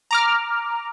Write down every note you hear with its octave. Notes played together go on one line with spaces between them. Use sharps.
A#5 D6 F6